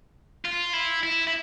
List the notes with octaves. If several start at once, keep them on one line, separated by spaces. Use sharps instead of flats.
F4
E4
E4
E4